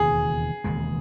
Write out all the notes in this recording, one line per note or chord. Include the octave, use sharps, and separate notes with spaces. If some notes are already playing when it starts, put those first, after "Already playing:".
Already playing: E1 D#2 C#3 E3 G#4
E1 D#2 C#3 G#3